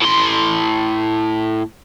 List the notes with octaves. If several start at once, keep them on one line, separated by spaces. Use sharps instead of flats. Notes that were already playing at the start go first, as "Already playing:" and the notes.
A2 C6